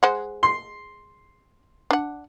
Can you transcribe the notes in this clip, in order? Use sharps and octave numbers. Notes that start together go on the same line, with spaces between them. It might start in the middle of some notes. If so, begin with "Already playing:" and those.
G#3 C5 F#5
C6
D4 F#5